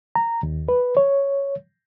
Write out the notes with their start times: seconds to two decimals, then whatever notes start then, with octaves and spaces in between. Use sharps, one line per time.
0.15 A#5
0.43 D#2
0.69 B4
0.97 C#5